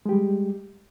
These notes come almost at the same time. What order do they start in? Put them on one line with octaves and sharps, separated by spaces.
G#3 G4 G3